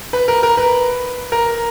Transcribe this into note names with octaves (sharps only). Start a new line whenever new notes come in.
B4
A#4
A#4
B4
A#4